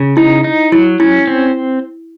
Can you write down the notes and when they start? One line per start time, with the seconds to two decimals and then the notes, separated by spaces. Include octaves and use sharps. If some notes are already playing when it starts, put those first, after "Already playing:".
Already playing: C#3
0.17 D#4 E4
0.44 D#4
0.72 F#3 E4
1.00 C#4 E4
1.27 C4